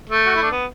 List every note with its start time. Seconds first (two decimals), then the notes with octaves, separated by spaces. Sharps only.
0.09 A3
0.26 F#4
0.35 E4
0.42 D4
0.51 B3